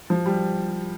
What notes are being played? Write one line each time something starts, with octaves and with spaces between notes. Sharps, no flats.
F3
G3